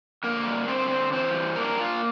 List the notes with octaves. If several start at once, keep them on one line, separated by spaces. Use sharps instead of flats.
D3 A#3 A#4
G3
D3 C4 C5
C4
E3 C4 C5
G3
A#3 D4 A#4
A#3 F4